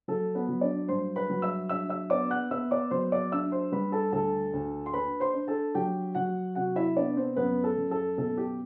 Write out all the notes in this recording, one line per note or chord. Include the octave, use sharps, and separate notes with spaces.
F#3 A4
B3 B4
F#3
D4 D5
G2 C5 C6
B4 B5
F#3
E5 E6
D4 E5 E6
E5 E6
B3 D5 D6
F#5 F#6
B3 E5 E6
D5 D6
F#3 C5 C6
D5 D6
D4 E5 E6
C5 C6
G3 B4 B5
A4 A5
D2 A4 A5
D2
C6
D4 B4 B5
C5 C6
D4
A4 A5
F#3 G4 G5
F#3 F#4 F#5
C3 F#4 F#5
E4 E5
B3 D4 D5
C4 C5
F#2 B3 B4
A4
F#2
A4
B2 A4
G4